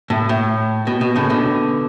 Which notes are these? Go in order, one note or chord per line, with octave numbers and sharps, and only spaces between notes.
A2
A2
B2
B2
A2 C#3
B2 D3